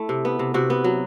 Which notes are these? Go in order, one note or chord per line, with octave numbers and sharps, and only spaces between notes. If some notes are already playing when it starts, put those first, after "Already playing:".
Already playing: A3 E4
C3
B3
C3
C3 F#4
B3
F#3